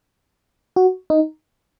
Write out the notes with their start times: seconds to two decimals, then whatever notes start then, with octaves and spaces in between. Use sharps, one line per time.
0.76 F#4
1.10 D#4